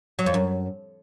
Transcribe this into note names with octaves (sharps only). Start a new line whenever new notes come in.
F#3
F2
F#2